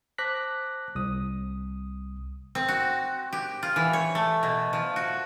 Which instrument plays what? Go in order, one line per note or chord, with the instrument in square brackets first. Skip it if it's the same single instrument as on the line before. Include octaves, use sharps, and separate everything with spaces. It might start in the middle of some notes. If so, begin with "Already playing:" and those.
[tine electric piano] C5 A5 D6 F#6 A#6 B6
C2 D#6
[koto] C4
F#4
G4
F4
E3
C#5
A3
B2
F3
F#4